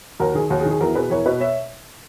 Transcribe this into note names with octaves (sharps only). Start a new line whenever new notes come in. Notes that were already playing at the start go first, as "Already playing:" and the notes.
D#2 F#4 A#4
D#3 G#4
D#2 F#4
G#4
D#3
G#4
E2 F#4 A#4
B2 G#4 B4
E2 A#4 C#5
B2 B4 D#5
C#5 E5